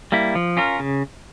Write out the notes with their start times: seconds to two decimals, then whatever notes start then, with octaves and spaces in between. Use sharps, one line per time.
0.12 G3 A#3 E4
0.35 F3
0.57 C#4 F4 A#4
0.79 C#3